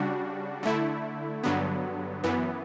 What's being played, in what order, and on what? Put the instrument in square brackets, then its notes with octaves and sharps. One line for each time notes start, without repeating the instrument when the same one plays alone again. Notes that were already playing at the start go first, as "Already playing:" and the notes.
Already playing: [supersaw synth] C#3 G3 D4 F#4
D3 A3 E4
G2 D3 F#3 B3
F#2 E3 B3